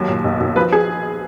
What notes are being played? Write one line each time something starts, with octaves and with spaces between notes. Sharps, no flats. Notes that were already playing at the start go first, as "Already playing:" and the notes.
Already playing: D#2 F#3
A#2
B1
B1
F3 B4
G#4